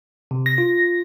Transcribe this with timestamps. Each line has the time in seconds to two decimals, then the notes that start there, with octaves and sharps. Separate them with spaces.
0.31 C3
0.46 A#6
0.58 F4